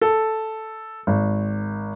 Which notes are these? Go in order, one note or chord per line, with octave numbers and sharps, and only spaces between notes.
A4
G#1